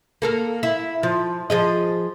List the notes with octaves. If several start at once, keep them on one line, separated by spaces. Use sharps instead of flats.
A#3 A4 A#4
E4
F3
F3 G#4 D#5